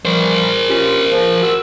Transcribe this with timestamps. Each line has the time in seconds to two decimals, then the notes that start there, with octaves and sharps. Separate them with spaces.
0.05 E3 F3 G3 A#4 C5
0.68 C#4 F4 G4
1.12 F3
1.42 F#4 E6